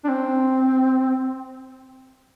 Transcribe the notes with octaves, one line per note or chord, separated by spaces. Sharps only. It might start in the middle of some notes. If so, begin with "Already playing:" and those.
D4
C4